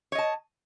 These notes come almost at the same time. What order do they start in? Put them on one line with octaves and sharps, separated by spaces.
C#5 D#5 A5